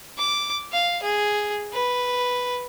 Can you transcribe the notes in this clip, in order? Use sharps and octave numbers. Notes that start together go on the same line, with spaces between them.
D6
F5
G#4
B4